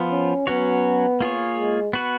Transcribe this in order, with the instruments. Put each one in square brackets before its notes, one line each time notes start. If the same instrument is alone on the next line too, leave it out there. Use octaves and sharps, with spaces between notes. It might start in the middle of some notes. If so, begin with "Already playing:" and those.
Already playing: [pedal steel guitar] F3 B3 F4
[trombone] C#4
[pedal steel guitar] F#3 C#4 F#4 C#5 [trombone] B3
[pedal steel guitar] A#3 F4 G#4 C#5
[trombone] G#3
[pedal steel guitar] B3 F#4 B4